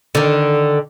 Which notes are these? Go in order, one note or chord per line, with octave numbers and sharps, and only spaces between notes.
D3 D#3